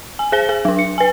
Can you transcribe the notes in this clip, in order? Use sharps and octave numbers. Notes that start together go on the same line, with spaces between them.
G#5
G#4 C5 G7
G#4 G#5
F#3 D4
C#7
B4 G#5